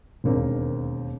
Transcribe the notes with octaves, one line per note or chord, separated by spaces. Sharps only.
E1 D#2 A#3 C4 D4